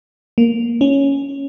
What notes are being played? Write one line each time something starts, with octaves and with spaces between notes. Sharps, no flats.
A#3
C#4